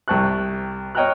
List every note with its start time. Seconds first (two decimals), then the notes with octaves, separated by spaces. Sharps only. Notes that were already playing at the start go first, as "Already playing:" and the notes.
0.08 C2 G5 A5 C#6 F#6
0.95 C#5 D#5 G5 A#5 F6 F#6